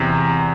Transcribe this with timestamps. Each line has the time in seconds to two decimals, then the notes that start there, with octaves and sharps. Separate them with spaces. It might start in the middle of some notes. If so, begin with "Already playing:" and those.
Already playing: E2 C3